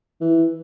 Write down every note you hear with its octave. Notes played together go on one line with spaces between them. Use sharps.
E3